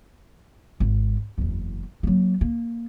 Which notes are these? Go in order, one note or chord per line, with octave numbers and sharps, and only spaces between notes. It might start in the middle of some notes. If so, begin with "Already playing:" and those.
G#1
F#1 E2
F#3 A#3
A#3